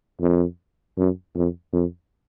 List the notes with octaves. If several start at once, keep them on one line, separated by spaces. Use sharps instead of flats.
F2
F#2
F2
F2